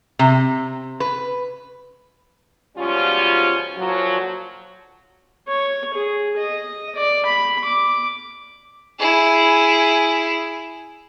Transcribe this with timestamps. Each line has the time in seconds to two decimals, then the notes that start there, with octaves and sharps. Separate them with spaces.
0.19 C3
1.00 B4
2.77 G#2 B2 F3 G3 C#4 F4
3.77 A#2 D3 F3 F#3
5.48 C#5
5.94 G#4
6.37 D#5
6.95 D5
7.25 B5
7.65 D6
8.99 E4 G#4